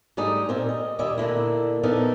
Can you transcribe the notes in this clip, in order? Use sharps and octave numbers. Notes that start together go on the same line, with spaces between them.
G#2 G3 A3 D#4 G4 D#5
A#2 C4 A#4
D#5
D#2 A#2 G3 D#5 E5
A#2 D3 A#3 E4
A#2 F3 B3 D#4 A4 A#4